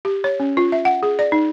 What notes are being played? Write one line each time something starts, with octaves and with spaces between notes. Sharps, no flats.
G4
C#5
C#4
F4
E5
F#5
G#4
D5
D#4